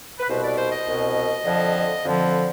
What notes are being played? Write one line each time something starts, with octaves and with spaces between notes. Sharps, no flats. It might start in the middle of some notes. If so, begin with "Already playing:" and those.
B4
C2 B2 C5
D5
C5
D#5
C2 B2
F2 D3 F3
F2 D3 F3